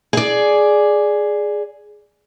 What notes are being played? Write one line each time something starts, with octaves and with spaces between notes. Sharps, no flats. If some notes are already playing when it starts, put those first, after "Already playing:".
G#4 D5